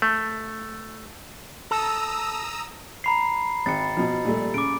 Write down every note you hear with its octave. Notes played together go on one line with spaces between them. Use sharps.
A3
A4 A#5 D#6 E6
A#5 B5 C7
G#1 A6 C#7
B2 F3
A#2 G3 A3
C#3 D6 D7